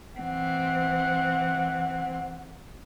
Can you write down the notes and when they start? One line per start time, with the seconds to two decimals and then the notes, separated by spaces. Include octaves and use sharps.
0.17 E3 C4 F#5